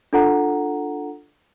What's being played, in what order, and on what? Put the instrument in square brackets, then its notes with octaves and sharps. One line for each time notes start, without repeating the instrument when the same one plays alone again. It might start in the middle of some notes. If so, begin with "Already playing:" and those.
[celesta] D4 F4 A4 F#5 A#5